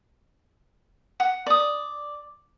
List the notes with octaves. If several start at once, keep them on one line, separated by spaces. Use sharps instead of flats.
F#5
D5 D#6